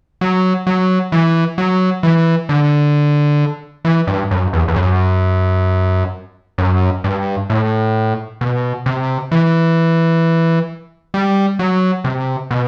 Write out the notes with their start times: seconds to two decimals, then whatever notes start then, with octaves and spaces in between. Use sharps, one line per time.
0.21 F#3
0.67 F#3
1.12 E3
1.58 F#3
2.03 E3
2.49 D3
3.85 E3
4.07 G2
4.31 F#2
4.53 E2
4.68 E2
4.76 F#2
6.58 F#2
7.04 G2
7.50 A2
8.41 B2
8.86 C3
9.32 E3
11.14 G3
11.59 F#3
12.04 C3
12.51 B2